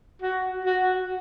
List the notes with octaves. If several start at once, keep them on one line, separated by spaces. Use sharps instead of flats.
F#4
F#4